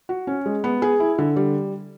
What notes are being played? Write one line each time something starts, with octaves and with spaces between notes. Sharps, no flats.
F#4
C#4
G#3
B3
G#4
E4
D3
G3